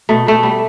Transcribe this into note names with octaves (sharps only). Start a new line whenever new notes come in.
B2 A3
B2 A3
G3